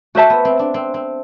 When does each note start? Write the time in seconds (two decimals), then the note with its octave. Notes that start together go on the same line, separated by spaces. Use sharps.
0.15 A3 F#4 C5 E5 A5
0.30 B3
0.45 C4
0.59 D4
0.74 C4
0.94 C4